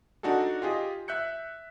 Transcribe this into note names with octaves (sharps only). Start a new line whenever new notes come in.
D4 D#4 F#4 G#4 A4
F4 G4 G#4 D#5
E5 F#6 G6 C#7